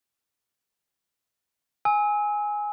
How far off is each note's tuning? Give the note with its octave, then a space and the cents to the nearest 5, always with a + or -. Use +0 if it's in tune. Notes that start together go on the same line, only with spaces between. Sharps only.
G#5 +0 E6 -35